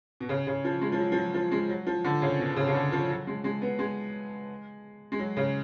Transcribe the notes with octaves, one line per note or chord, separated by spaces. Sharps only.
B2
C#3
C#3
F3
G#3
F3
F#3
F3
F#3
F3
G#3
F#3
F3
D3
C#3
B2
C#3
C#3
D3
F3
F#3
G#3
G#3
B3
G#3
G#3
F#3
C#3